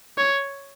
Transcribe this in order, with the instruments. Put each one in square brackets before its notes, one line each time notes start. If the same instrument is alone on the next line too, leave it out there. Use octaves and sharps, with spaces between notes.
[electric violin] C#5